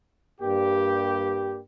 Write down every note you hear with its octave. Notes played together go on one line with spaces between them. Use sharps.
G2 G3 A#3 G4